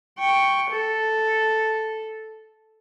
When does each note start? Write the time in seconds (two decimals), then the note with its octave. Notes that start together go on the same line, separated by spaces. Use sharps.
0.19 G5 C#6
0.70 A4